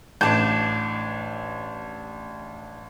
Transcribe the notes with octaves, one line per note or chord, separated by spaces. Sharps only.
A1 D4 A5 D6 G6